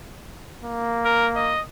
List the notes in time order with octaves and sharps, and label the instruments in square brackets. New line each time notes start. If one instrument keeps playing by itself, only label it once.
[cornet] A#3
[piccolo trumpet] A#4
D#5